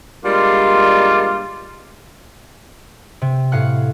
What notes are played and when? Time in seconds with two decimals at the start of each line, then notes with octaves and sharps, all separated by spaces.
0.25 G3 G#3 A#3 D4 F4
3.22 C3
3.52 A2 F5 F#5 F#6